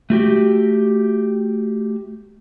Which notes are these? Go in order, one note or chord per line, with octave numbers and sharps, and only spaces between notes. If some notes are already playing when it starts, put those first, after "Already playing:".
A3 F#4 G4